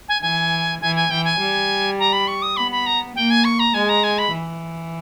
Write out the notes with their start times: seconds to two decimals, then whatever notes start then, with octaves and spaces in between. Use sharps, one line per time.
0.08 G#5
0.22 E3 G#5
0.81 E3 G#5
0.95 G#5
1.10 E3 G5
1.25 G#5
1.40 G3
1.99 A#5
2.13 B5
2.28 C#6
2.42 D#6
2.57 B3 B5
2.71 B5
2.86 A#5
3.16 A#3 G5
3.30 G#5
3.44 C#6
3.59 A#5
3.74 G#3 G#5
3.89 A#5
4.03 G#5
4.18 B5
4.32 E3